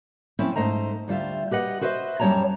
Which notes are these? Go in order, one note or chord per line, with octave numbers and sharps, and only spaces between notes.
F3 C4 C#4 E4
G#2 C#3 A3 C5 D#5 A#5
D2 G3 F4 E5
G4 B4 D#5 F#5
F#4 B4 C5 D#5 E5
F#2 G3 C#4 C#5 A5 A#5